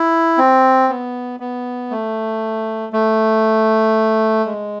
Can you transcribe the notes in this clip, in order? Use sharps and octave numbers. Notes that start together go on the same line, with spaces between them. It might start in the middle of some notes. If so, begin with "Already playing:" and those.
Already playing: E4
C4
B3
B3
A3
A3
G#3